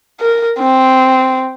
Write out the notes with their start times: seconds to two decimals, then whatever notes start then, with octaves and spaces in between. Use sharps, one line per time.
0.20 A#4
0.59 C4